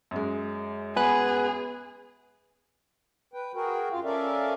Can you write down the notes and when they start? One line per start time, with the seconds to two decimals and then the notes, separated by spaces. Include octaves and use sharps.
0.11 F#2 G#3
0.96 B3 G#4 B4 G#5 F#6
3.34 B4 G5
3.55 F#4 G#4 A#4 G5
3.92 F#2 F4 F5
4.04 C#4 A4 A#4 D5 E5 F5